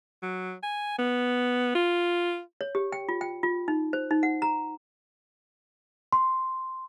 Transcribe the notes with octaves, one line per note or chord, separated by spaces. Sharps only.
F#3
G#5
B3
F4
C#5
G4
G5
F4
G5
F4
D#4
C5
D#4
F#5
A#5
C6